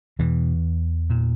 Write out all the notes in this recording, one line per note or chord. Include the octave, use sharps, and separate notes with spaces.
E2 B2 E3
A#2